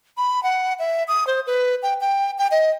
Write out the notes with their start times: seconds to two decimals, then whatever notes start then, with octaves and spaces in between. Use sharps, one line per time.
0.17 B5
0.43 F#5
0.79 E5
1.08 D#6
1.27 C5
1.47 B4
1.83 G5
2.01 G5
2.38 G5
2.51 D#5